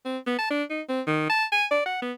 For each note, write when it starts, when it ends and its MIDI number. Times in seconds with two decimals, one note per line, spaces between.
0.05 0.18 60
0.27 0.35 59
0.39 0.46 81
0.51 0.63 62
0.70 0.82 63
0.89 1.02 60
1.07 1.29 51
1.30 1.45 81
1.52 1.66 80
1.71 1.81 74
1.86 1.98 78
2.02 2.12 59